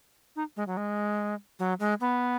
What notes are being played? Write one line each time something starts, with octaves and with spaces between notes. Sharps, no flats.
D#4
G#3
F#3
G#3
F#3
G#3
B3